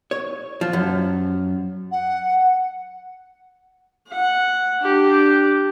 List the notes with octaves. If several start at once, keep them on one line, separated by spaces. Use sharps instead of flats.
C#5
F3
F#2
F#5
F#5
D4 G4